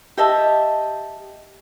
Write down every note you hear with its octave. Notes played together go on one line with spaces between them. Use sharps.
G4 D#5 E5 A5